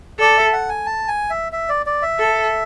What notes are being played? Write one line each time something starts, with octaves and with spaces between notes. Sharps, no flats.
A4 D5
E5
F#5
G#5
A5
G#5
E5
E5
D5
D5
E5
A4